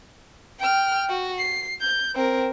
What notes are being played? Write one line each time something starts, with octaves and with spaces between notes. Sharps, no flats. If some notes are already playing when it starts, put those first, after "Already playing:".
G5 F6
F#4
C7
G6
C4 A#4